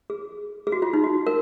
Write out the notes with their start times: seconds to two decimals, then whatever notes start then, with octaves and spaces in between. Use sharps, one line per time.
0.10 G#4
0.67 G#4
0.72 F#4
0.82 F4
0.93 D#4
1.04 F#4
1.27 A#4